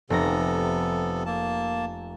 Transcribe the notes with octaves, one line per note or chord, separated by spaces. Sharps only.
F1 C3 B3 A4 A#5
A#3 A5